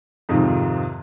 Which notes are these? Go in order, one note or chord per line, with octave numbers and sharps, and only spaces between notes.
F2 G#2 C3 D#3 F3